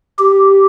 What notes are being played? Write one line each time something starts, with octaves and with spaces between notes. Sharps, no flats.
G4